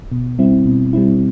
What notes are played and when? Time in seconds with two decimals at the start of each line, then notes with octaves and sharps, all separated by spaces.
0.12 B2
0.39 G3 C4 E4
0.66 B2
0.93 G3 C4 E4